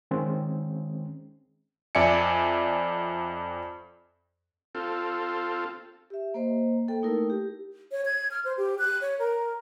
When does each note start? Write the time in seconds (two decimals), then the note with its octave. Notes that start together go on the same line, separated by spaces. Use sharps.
0.11 D#3 G#3 C4 C#4
1.95 F2 D5 E5 G#5 C#7
4.75 C4 F4 A4
6.10 G4 E5
6.34 A#3 C5 D#5
6.88 A#3 A4 G5
7.02 A3 D#4 E4 A#4
7.30 G4
7.92 C#5
8.05 G#6
8.31 F6
8.45 C5
8.58 G4
8.79 F#6
9.01 C#5
9.19 A#4